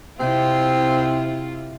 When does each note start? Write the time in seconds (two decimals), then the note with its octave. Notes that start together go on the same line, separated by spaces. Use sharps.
0.19 C3 C4 E4 F4